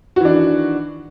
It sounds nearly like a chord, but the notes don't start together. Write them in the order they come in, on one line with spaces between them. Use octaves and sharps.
F#4 E3 D4 D#3